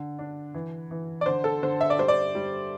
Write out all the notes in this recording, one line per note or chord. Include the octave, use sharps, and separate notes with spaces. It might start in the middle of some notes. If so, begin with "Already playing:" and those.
Already playing: D3
D4
E3
E3
D5
D3 C5
A4
D3 C5
E5
D5
G3 C5
D5
G3